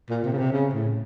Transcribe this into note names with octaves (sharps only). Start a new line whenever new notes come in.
A#2
C3
C#3
C3
C#3
A2